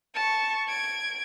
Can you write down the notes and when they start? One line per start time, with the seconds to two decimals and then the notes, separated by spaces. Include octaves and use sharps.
0.15 A5 C#6
0.68 G#6 D7